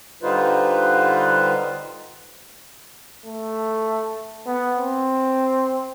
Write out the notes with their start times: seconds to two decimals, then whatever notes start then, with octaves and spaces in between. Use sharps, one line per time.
0.23 D3 G3 D#4 F4 B4 C5
3.26 A3
4.46 B3
4.77 C4